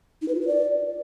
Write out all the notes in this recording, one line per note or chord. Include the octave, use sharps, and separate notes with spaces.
D#4
B4
F4
B4
D5